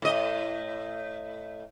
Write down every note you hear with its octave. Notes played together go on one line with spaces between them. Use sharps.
A2 D#5